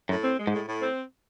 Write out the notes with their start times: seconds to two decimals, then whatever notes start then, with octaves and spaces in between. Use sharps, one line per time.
0.09 F#2 A2
0.23 C4
0.39 G#3
0.47 G#2
0.53 A2
0.66 A2
0.81 C4